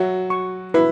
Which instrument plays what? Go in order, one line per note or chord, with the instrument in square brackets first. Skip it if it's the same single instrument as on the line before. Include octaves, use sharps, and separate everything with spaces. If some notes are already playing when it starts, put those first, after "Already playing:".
Already playing: [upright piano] F#3 F#4 [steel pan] E5
[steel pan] C#6
[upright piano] E4 [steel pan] B4